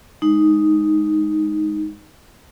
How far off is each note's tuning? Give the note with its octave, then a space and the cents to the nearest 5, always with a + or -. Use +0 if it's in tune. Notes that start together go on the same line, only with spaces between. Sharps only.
G#3 +0 D#4 +0